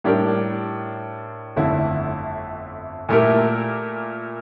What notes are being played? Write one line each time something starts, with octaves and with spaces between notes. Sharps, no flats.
A2 G3 D4 G4 A#4
G1 F2 D3 A3 E4
A#2 A3 E4 G4 A#4